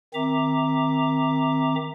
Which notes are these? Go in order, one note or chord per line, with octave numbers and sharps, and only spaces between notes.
D#3 C4 E5 A#5 D6